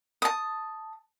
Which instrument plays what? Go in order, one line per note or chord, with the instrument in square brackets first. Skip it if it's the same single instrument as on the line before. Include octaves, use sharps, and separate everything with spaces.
[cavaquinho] A5 D#6